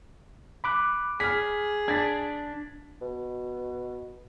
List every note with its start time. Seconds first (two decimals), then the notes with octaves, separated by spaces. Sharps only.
0.64 B5 D6 F#6
1.20 G#4 F6 B6
1.88 D4 G#6 A6 B6
3.01 B2